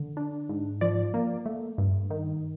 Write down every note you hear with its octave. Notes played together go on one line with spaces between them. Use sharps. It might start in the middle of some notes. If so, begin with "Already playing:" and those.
Already playing: D3
D4
G#2
F3 D5
A#3
A3
G2
D#3